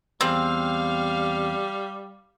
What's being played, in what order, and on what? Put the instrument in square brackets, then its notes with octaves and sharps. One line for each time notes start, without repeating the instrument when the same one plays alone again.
[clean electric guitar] E2 G#4 [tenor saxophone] G3 [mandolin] C4 [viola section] F5